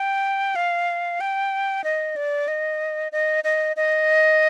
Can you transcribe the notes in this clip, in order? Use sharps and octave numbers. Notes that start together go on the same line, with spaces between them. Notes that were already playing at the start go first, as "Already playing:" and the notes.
Already playing: G5
F5
G5
D#5
D5
D#5
D#5
D#5
D#5